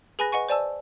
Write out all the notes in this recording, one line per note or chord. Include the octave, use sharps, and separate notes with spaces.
G#4 B4 G#5 B5 F#6 A#6
B4 D#5 F#5 G#5 C#6
C5 D5 G#5 A5 E6